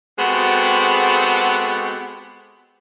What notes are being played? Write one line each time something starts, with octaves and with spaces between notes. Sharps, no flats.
G#3 B3 C4 F#4 G4 A4